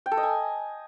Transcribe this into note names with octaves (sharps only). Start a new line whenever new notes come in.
G5
A4
D#5
G#5